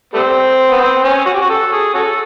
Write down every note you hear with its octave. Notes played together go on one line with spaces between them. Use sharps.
G3 A3 C4
B3
C4
C#4
F#4
G4
F#4
A4
G#4
C#4 F#4 A4